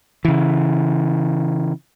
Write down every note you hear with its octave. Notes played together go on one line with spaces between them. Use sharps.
C#3 E3